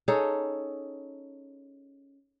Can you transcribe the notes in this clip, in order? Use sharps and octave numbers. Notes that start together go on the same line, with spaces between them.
C#4 D#4 G#4 A4